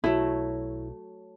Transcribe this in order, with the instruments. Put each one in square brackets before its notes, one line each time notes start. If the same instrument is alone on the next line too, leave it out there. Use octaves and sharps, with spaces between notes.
[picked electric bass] B1 [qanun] F#3 A3 [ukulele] E4